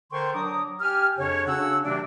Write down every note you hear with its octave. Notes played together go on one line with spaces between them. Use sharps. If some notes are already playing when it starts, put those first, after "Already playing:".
D3 A#4 C5 G5 C6 C#6
F#3 D4 A#5 D6 D#6
G4 G#5 F6
F2 C#3 D4 C#5
C#3 C#4 D4 F#4 F#5 E6
C3 D#3 F#3 A3 D4